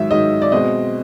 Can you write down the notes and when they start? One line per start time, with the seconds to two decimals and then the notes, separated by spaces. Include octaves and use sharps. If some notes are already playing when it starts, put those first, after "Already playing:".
Already playing: G#2 D#3 F#3 E5
0.11 G#2 D#3 F#3 D#5
0.42 D5
0.52 B2 G#3 C4 D#5